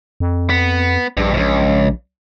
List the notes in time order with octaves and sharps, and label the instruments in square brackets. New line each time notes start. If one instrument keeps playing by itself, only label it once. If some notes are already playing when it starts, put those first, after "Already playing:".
[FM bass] F2
[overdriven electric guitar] B3
[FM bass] A#1 [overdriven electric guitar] G2
[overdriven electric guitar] C#2 G#2